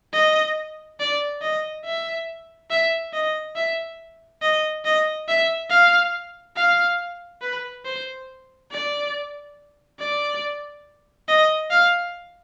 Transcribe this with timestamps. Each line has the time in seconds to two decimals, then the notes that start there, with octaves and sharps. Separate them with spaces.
0.13 D#5
1.00 D5
1.42 D#5
1.85 E5
2.70 E5
3.13 D#5
3.56 E5
4.42 D#5
4.85 D#5
5.28 E5
5.70 F5
6.56 F5
7.42 B4
7.85 C5
8.71 D5
10.00 D5
11.28 D#5
11.71 F5